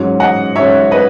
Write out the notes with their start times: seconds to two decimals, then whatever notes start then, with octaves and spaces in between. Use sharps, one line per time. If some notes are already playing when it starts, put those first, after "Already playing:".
Already playing: G#2 F#3 C#4
0.20 D#5 F#5
0.56 G#2 F#3 C#4 C#5 E5
0.91 B4 D#5